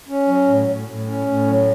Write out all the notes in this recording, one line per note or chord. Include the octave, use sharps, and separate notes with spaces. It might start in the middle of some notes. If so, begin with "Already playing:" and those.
C#4
F#3
A2
A2
A2
C#4
A2
F#3